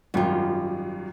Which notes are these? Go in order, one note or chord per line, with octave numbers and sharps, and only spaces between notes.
G#1 F#2 G3 F4